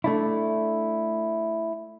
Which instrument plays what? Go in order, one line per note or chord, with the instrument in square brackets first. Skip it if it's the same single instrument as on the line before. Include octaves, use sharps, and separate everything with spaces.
[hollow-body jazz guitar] A3 D4 E4